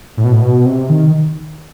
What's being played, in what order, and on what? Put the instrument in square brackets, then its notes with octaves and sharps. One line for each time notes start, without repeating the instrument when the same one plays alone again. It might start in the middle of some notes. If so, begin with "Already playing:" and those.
[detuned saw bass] A2
B2
A2
B2
C3
D#3